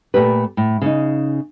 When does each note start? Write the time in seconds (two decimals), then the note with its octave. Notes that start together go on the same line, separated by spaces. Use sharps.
0.14 A#2 A3 G4 B4
0.57 A2
0.82 C#3 D#4